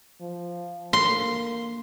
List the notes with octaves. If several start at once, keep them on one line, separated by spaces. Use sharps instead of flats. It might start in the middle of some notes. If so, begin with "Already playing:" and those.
F3
A#3 C6